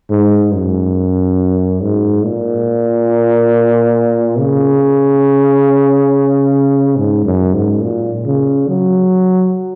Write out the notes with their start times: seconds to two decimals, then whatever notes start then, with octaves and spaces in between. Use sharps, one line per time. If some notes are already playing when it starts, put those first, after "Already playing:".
0.10 G#2
0.54 F#2
1.82 G#2
2.25 A#2
4.39 C#3
6.97 G#2
7.26 F#2
7.54 G#2
7.83 A#2
8.26 C#3
8.68 F#3